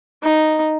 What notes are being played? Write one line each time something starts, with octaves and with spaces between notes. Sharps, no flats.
D#4